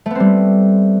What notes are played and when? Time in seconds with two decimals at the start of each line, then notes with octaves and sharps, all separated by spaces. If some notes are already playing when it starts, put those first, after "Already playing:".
0.06 A3
0.10 B3
0.15 C4
0.20 G3